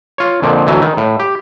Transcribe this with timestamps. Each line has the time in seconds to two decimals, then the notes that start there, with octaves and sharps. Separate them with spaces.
0.18 F4 C#5
0.42 F2 A#2 D3 F3
0.67 D2 E3 F#3 D#5
0.81 D#3
0.97 A2
1.20 G4